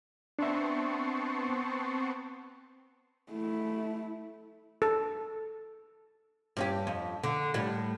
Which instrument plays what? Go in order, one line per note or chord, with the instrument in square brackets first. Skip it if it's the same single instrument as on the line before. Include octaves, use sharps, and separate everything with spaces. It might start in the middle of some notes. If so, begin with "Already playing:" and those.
[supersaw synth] B3 C4 [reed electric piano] D4 E5 [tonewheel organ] A5 C6 C#6
[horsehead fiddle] A3 E4
[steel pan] A4
[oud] G2 C#4 G4
F2
D3
A2 G3